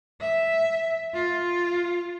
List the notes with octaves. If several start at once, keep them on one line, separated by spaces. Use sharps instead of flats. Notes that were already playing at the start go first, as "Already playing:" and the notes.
E5
F4